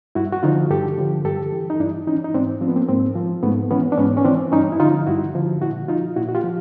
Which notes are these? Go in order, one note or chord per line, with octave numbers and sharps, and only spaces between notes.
G2 E4 F#4
F#4
D3 F3 D#4 F4
G2 G4 A4
D3 F3
G2 G4 A4
E3
D#4
G2 D4 E4
E3 C#4 D#4
D#4
G#2 C4 D4
F3 C4
B3
A#3 C4
G#2 A#3 C4
F3
G#2 A3 B3
E3 B3 C#4
D4
G#2 B3 C#4
C#4
E3 C4 D4
G2 C#4 D#4
E4
D3 F3 D#4 F4
G2 E4 F#4
D3 F3
A#2 E4 F#4
F3 D#4 F4
A#2 E4 F#4
F#4
F4 G4
F3